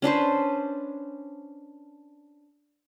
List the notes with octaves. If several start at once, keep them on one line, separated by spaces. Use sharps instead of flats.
C#4 D4 B4 C5